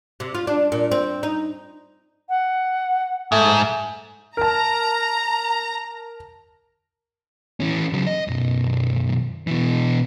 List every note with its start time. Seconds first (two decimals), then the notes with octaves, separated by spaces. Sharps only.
0.20 C3
0.35 F4
0.47 D4
0.72 A#2
0.91 C4
1.23 D#4
2.29 F#5
3.32 G#2 A3
4.37 A#4 A5 A#5
7.60 E3 C#4
7.93 C#2 F#3
8.07 D#5
8.28 B1 F#2
9.47 B2 E3